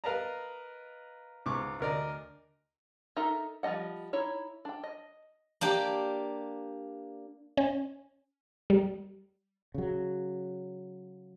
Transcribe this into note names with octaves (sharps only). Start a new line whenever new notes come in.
A#4 B4 D#5 F5 A5 A#5
C#2 G#2 C#6 D6
D2 A#4 D5 D#5
D#4 A4 A#4 E5
F3 G3 D4 D#5 F#5
D#4 E4 C#5
D4 G5
D#5
A#3 D4 G4
C#4
G3
C#3 F#3